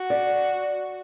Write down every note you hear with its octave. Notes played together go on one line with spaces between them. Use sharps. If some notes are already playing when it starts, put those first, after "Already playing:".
Already playing: F#4
D5